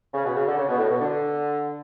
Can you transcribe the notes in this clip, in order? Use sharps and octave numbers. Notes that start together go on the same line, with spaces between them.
C#3
B2
C#3
D3
C#3
B2
A2
B2
D3